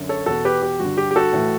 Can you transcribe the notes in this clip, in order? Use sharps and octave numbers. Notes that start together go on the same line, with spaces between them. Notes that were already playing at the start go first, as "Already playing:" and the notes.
Already playing: F#2 D3
A4 C#5
E2 B2 F#4 A4
G4 B4
G4
G2 F#4
D3
G4
G4
F#4 A4
A2 E3